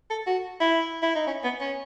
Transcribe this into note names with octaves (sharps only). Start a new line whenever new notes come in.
A4
F#4
E4
E4
D#4
C#4
B3
C#4